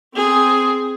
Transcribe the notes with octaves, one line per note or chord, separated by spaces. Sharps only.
C4 G#4